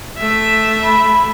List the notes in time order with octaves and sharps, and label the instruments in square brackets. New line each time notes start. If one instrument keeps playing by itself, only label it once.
[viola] A3 E5
[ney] B5